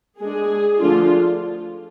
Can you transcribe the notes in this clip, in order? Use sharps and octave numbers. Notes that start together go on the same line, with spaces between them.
G#3 D4 G#4
D3 F3 A3 D4 F4